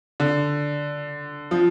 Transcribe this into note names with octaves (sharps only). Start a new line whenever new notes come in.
D3
F3